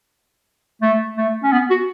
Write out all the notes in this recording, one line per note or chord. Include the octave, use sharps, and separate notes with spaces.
A3
A3
C#4
B3
F#4